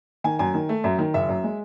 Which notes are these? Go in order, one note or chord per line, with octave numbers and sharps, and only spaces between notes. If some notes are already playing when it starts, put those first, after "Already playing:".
D#3 G#5
F#2 G#5
D#3
A3
F#2 E5
D#3
F#1 E5
F#2
G#3